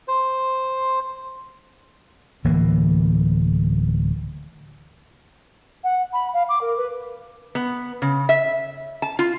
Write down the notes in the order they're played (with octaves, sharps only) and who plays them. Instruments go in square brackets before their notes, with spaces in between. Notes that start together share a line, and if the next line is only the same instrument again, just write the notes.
[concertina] C5
[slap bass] D1 E3 A#3
[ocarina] F#5
B5
F5
D6
A#4
B4
[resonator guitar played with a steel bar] B3
C#3
E5
A5
F4